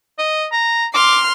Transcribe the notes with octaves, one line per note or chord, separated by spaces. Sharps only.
D#5
A#5
C6 D6 F6